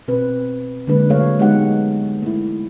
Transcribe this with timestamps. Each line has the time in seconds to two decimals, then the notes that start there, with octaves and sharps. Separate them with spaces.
0.08 B2 C4 B4
0.87 D3 F#3 G#3 A#3 D4 B4
1.09 D3 F#3 A3 A4 C#5 F5
1.39 G#3 B3 D#4 G4 F#5
2.22 A3 E4